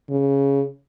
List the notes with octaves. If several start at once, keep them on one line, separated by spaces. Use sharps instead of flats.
C#3